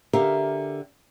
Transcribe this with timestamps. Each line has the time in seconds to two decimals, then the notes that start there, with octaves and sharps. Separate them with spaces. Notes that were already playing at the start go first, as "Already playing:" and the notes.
0.13 D3 G4 A#4 E5 F5